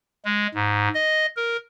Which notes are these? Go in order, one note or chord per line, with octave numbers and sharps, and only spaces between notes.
G#3
G#2
D#5
A#4